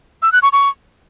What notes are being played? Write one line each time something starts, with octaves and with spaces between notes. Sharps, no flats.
E6
F#6
C#6
C#6